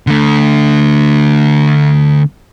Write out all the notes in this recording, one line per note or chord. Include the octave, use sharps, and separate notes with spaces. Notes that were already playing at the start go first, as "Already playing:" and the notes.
D3 A3